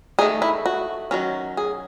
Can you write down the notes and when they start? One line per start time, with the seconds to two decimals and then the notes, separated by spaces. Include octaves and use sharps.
0.19 D#3 A3 D#4 G#4
0.42 E4
0.66 F#4
1.11 D#3 F#3 C#4
1.57 G#4